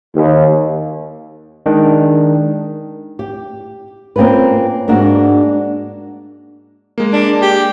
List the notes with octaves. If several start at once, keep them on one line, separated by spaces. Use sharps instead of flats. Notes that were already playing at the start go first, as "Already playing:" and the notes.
D#2
D#3 G#3 D4
G4
A#3 C4 C#4 F4 B4
G#2 A#3 D4 F#4 F#5
G#3 A#3
D4
G4